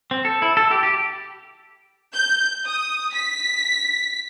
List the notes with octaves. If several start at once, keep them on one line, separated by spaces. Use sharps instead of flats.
C4
A4
E4
A4
G4
G4
G6
D#6
B6